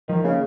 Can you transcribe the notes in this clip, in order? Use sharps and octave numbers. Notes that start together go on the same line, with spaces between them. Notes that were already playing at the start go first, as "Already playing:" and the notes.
D#3 F3
C#3 A#3